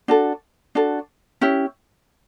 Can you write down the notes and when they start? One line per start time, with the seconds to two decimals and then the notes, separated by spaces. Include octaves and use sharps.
0.08 D4 F#4 A4
0.75 D4 F#4 A4
1.41 C#4 E4 G4